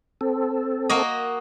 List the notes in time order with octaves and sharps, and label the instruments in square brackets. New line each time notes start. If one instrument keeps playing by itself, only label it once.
[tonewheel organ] C4 A4
[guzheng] A#3 F#4 D#5